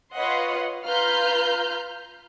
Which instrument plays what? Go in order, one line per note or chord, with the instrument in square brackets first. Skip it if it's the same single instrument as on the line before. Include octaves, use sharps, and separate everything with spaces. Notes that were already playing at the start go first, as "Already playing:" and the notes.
[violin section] F4 B4 C#5 D#5 F#5 C6
F4 B4 A#5 F6 G6